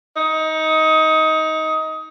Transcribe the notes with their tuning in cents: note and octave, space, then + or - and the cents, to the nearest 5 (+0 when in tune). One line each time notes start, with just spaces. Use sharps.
D#4 +20